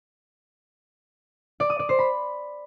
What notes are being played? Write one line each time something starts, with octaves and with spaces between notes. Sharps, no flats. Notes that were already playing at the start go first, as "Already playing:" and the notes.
D5
D#6
D5
C5
B5